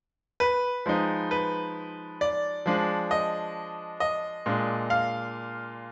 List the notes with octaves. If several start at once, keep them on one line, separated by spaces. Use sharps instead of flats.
B4
F3 G#3 D#4
B4
D5
F3 G#3 D4
D#5
D#5
A#2 G#3 D4
F5